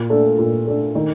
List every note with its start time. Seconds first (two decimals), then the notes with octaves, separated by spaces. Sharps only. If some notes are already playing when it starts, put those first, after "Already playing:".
Already playing: A#2
0.10 A3 D4 A4
0.39 A#2
0.67 A3 D4 A4
0.95 D#3